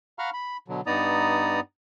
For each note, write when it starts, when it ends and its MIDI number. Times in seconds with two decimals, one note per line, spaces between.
0.19 0.30 77
0.19 0.30 78
0.19 0.30 82
0.19 0.30 83
0.19 0.30 85
0.19 0.30 89
0.33 0.57 83
0.68 0.81 47
0.68 0.81 50
0.68 0.81 54
0.86 1.60 43
0.86 1.60 59
0.86 1.60 63
0.86 1.60 74
0.86 1.60 82
0.86 1.60 87